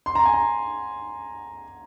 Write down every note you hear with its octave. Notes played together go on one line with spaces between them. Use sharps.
C6
A#5
G#5
A#5